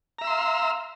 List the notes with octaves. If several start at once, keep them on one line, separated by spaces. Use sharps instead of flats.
E5 F5 A#5 C6 E6